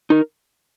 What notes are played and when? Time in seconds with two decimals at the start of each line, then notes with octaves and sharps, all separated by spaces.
0.10 D#4 A#4